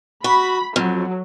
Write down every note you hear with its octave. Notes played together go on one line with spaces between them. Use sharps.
F#4 B5
F2 F#3